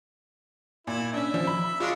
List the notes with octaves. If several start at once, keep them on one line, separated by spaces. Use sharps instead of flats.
A#2 E4
C#4 D4 E5
F3
B5
G#3 C#4 D4 F4